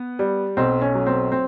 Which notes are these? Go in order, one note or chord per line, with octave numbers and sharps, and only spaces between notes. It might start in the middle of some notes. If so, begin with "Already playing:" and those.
Already playing: B3
G3
B1 C4
C#4
F#3
C4
C4